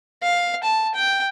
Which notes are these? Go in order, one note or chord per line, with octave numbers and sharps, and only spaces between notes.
F5
A5
G5